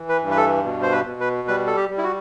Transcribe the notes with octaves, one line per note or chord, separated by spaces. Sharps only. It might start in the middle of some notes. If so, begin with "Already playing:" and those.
Already playing: E3
B4
G2
B4
A4
B2
C5
B4
B2
B4
G3 B4
A4
G4
G3
E4
F#4